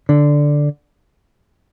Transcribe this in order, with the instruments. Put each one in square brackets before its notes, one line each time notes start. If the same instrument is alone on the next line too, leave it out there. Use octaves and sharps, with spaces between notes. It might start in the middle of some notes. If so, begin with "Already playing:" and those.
[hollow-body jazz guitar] D3